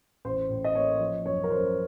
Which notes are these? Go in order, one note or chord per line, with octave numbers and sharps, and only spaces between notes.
A1 C5
A2
D#5
A#3 C#5
F3
F#2 C#5
A#4
F#2 C5